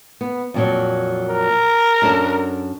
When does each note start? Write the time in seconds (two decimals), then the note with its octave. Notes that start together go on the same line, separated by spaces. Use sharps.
0.21 B3
0.54 F2 A#2 F#3
1.29 A#4
2.02 F#2 D4 A4